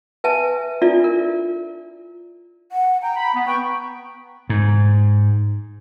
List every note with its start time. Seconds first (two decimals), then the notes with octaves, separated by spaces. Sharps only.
0.24 B4 E5 G#5 A5
0.82 D4 E4 F4 A4 D5 E5
1.04 A#4
2.72 F#5
3.03 G5 A#5
3.17 B5
3.34 B3
3.47 B4 G5 C#6
4.49 G#2